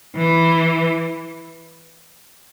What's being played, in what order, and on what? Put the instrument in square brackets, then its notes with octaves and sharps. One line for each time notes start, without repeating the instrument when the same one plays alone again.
[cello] E3